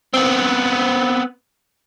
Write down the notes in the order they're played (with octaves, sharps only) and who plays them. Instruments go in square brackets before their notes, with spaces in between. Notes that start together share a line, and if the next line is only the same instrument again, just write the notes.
[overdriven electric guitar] B3 C4